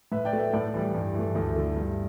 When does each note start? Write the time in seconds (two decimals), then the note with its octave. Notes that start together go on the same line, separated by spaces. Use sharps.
0.12 A2 B4 E5
0.25 D5 G5
0.33 A3
0.39 B4 E5
0.53 A2 A4 D5
0.74 E3 G3
0.94 G2
1.14 E3 A3
1.35 D2 E4 A4
1.56 D3 A3
1.76 G2